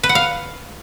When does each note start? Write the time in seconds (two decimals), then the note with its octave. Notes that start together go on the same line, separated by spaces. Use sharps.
0.03 B4
0.09 F#5
0.15 F5